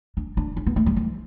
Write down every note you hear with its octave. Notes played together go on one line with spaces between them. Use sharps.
D4
D4
D4
B3
A3
G3
E3